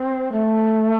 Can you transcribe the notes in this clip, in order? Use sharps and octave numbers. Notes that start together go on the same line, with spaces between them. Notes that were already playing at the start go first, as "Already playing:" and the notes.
Already playing: C4
A3